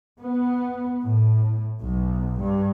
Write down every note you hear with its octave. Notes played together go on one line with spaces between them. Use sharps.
B3
A2
B1
G2